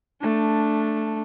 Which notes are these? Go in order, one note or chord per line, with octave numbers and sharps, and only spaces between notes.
A3 D4